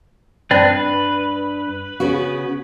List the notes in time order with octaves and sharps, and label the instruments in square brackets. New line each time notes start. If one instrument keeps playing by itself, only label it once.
[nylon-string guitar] G2 [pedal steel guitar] C4 D4 B4
[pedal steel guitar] B4
[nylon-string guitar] C#3 B3 F#4